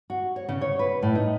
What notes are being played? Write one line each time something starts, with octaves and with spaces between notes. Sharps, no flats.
F#4
C#5
C#3
C#5
B4
A2
D#4